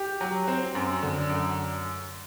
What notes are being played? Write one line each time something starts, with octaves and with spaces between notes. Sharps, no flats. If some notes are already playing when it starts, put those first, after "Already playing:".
Already playing: G4
F#3
C4
F#2
D3
F#2